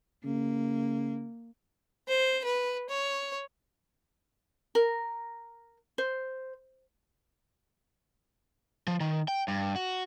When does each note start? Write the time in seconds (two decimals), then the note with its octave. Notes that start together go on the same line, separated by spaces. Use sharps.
0.25 C#3 A#3
2.08 C5
2.45 B4
2.90 C#5
4.75 A#4
5.98 C5
8.88 F3
9.00 D#3
9.28 G5
9.48 G2
9.76 F#4